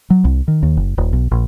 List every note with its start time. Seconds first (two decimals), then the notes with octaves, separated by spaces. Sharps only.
0.10 F#3
0.24 C2
0.48 D#3
0.63 D#2
0.77 F#1
0.98 D#1
1.13 B1
1.31 A#1